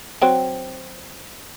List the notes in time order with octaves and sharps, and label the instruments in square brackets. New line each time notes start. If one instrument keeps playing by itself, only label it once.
[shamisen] F#3 C4